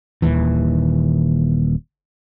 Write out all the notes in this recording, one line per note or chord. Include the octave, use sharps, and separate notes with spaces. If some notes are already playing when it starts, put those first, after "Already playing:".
D#1 D#2 E3